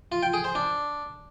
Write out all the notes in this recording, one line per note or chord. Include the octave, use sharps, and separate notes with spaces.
F4
G5
G#4
C5
D4